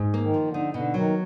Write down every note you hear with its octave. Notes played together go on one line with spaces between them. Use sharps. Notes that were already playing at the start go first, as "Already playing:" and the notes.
Already playing: G#2
A#3
D#3
F3
D3
D#4
B2 D3
D#3 F#3